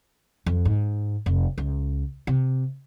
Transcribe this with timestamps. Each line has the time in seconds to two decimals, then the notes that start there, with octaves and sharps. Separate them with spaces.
0.46 F2
0.65 G#2
1.26 F1
1.58 C#2
2.27 C3